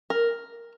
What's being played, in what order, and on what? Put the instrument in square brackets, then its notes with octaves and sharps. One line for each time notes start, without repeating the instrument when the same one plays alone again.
[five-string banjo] A#4